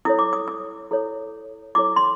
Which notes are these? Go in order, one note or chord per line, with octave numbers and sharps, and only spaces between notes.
E4 A4 C#5 D#6
D6
D#6
D#6
E4 A4 C#5
E4 A4 C#5 D6
C6